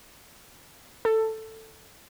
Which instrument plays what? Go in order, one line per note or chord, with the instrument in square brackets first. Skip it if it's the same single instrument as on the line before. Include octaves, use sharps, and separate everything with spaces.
[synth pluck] A4